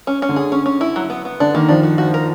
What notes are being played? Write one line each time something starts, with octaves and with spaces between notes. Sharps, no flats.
C#4
C#4
D3
G#4
C#4
C#4
E4
F#3
B3
B3
D3 D4
D#3 A#3
F3 D4
F#4
F#4
A#4